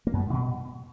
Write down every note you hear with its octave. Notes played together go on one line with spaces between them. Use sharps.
A#3
F#2
G3
G#2
B2